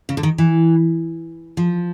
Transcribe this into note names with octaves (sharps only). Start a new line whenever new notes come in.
C#3
D3
D#3
E3
F3